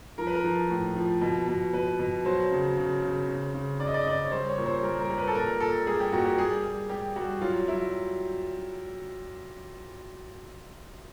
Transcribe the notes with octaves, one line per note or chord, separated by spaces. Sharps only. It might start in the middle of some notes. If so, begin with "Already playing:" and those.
F3 A#4
B4
A#4
F3
A2
F3
B2
B2
B2 B4
B2
F#3 C5
C#3
C#3
C#3
C#3
C#3
C#3 D5
D#5
D5
D#5
C#3 D5
C#5
G3 C5
C#5
A#2
C5
G3 A#4
A#4
G3
B4
A4
A#2 A#4
A#2 A4
G3 G#4
G4
A#2 F#4
G4
G3 G#4
G3
G3 G4
G3 F#4
F#3 F4
F#3 E4